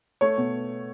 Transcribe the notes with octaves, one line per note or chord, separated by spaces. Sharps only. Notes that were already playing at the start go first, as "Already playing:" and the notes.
A3 C#5
B2